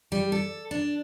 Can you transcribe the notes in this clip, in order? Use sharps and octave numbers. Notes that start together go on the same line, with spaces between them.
G3
A4
D4